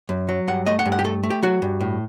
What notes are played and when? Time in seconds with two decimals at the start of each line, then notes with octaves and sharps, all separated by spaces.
0.09 F#2
0.29 F#3
0.48 G2 F#5
0.66 A3 D#5
0.79 F#5
0.86 G2
0.92 F#5
0.99 G4
1.04 A3 A4
1.23 A3
1.30 G4
1.43 F#3 F#4
1.62 G2
1.81 A2